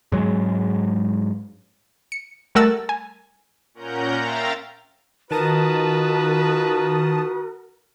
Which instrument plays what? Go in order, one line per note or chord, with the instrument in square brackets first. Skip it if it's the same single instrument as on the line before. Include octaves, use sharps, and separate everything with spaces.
[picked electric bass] G#2 F#3 G#3
[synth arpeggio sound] C#7
G3 A3 A#4 F#5 E6 A6
G#5
[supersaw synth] A#2 C#4 A#4 F#5 A#5 G6
E5 F5 G5 A#5 C6 A6
[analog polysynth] D#3 A5 D#6 [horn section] F4 B4 [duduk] F#4 [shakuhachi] A#4